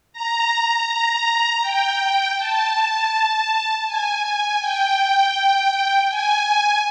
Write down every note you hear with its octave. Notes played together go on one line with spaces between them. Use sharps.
A#5
A#5
G5
A5
G#5
G#5
G5
G#5